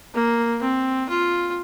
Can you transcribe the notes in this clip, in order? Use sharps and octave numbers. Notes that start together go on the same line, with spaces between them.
A#3
C4
F4